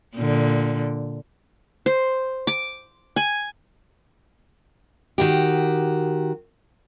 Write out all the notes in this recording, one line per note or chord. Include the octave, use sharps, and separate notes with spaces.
A#2 D3
C5
D6
G#5
D#3 F#4 G4